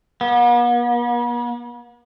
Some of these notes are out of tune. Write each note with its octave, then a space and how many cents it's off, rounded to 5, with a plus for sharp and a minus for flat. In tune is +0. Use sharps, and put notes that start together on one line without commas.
B3 -45